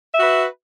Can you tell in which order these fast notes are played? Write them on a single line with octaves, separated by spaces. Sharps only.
E5 F#4 B4